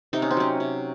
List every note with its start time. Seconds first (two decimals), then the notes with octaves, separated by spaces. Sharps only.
0.13 C3 D#4
0.22 C#4
0.31 C4
0.37 F#3 C#4
0.60 C3